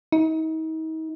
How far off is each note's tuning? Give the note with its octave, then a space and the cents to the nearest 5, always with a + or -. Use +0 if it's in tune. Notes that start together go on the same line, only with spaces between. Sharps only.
D#4 +40